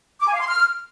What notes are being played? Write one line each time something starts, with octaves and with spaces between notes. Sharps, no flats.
D6
G#5
F5
C6
F6